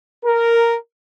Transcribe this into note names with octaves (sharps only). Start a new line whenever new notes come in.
A#4